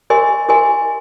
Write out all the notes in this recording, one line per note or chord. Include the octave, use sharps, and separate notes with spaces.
G4 A#4 D#5 G#5 C6
G4 A#4 D#5 G#5 C6